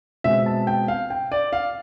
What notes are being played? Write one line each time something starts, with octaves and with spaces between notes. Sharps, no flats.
B2 G#3 C4 E5
A5
G5
F5
G5
D5
F5